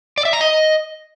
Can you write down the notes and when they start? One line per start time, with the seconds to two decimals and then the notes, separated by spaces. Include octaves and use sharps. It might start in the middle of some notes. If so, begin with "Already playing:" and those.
0.18 D5
0.25 E5
0.33 A#5
0.41 D#5